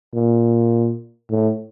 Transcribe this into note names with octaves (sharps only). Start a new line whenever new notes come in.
A#2
A2